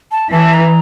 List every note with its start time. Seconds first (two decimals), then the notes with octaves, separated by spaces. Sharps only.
0.12 A5
0.32 E3 A5
0.54 A#5